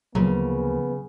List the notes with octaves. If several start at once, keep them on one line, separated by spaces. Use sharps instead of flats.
D2 C#3 F3 F#3 A#3 B3